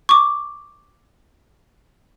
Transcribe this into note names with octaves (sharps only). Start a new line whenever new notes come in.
C#6 D6